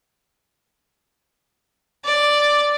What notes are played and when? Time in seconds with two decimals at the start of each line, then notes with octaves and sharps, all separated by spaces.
2.05 D5